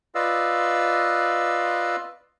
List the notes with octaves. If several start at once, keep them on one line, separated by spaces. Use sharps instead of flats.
F4 B4 D5 D#5 F5 E6